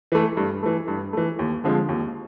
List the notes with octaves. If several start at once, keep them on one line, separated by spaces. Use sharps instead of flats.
E3 A3
G2
E3 A3
G2
E3 A3
D#2
D3 F3 G#3 C4
D#2